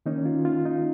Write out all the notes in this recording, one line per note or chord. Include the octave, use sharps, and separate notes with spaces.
D#3 A#3 C#4 D#4
F4
F4
D#4